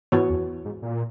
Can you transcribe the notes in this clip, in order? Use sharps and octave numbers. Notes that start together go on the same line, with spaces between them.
G#2 E3 B3 F#4 C#5
E2
G#2
A#2